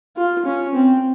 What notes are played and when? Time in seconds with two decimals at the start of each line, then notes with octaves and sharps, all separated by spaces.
0.17 F4
0.46 C#4
0.74 C4